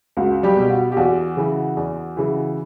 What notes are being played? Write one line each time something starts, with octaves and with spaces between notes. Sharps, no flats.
C#2 F#4
G3 G4
B2
F#4
G4
E2 F#4
C#3 E3
E2
C#3 E3